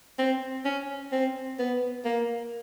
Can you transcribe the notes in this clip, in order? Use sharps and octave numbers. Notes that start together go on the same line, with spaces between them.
C4
C#4
C4
B3
A#3